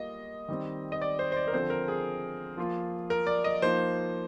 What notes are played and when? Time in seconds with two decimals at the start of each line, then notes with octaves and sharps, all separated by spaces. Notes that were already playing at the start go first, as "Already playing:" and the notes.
Already playing: G3 A#3 F4 D#5
0.49 D#3 G3 C4
0.92 D#5
1.02 D5
1.19 C5
1.32 C5
1.36 D5
1.48 A#4
1.53 D3 F3 C4 C5
1.70 A#4
1.88 G#4
2.57 F3 A#3 F4
3.10 A#4
3.27 D5
3.44 D#5
3.62 F3 A#3 D#4 C5